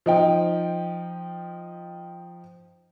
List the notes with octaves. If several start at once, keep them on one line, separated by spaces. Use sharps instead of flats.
F3 D#4 G5